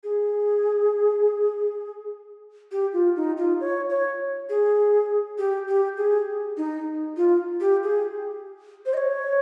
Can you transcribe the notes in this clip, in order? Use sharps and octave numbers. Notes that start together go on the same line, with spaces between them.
G#4
G4
F4
D#4
F4
C#5
C#5
G#4
G4
G4
G#4
D#4
F4
G4
G#4
C5
D#5
C#5